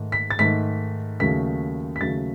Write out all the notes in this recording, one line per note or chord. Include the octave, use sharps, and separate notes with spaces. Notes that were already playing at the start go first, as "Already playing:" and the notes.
Already playing: G#2 D#3 A3
B6
A6
G#2 D#3 A3 B6
D#2 C#3 F#3 A3 B6
B6
D#2 C#3 F#3 A3 A6